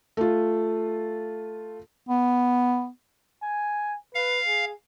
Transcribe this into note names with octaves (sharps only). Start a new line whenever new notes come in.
A3 F4
B3
G#5
B4 F5
G#4